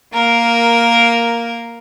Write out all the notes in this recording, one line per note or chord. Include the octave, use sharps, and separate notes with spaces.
A#3 A#4